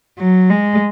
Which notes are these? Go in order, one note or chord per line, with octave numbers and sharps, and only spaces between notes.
F#3
G#3